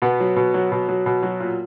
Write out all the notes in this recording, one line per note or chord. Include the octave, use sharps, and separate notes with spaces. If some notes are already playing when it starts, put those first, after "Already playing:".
B2 B3
F#3
B2
F#3
B2
F#3
B2
F#3
A#2